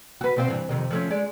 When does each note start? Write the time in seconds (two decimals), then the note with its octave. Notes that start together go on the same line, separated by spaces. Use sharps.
0.21 F#4 B4
0.36 B2 C4 F5
0.48 G2 E3
0.69 F2 C3 D#3
0.90 F3 A3 C#4
1.10 G#3 D5